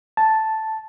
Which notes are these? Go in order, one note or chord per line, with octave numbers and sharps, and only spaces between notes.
A5